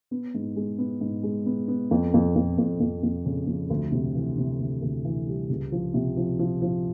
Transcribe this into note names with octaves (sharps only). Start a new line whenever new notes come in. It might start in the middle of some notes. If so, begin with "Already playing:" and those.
B3
G#2
G#3
B3
G#2
G#3
B3
B3
F2
F2
F2
F2
F2
F2
C#3
F2
D2
C3
E3
C3
D2
D2
E3
G3
C#2
F3
C3
F3
F3
F3